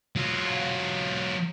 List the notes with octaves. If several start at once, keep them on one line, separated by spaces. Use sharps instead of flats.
F#3 F4